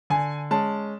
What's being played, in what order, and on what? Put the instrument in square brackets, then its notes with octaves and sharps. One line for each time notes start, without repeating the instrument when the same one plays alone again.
[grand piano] D3 G#5
G#3 C#4 A5